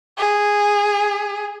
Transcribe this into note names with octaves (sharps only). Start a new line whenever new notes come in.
G#4